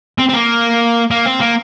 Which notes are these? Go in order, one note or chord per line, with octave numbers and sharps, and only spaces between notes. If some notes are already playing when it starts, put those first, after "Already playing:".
C4
C4
A#3
A#3
C4
A#3